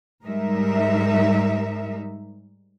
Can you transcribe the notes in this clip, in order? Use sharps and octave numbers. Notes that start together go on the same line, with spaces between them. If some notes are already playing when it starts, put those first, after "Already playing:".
G#2 G3 G#3 D#4 A#4 E5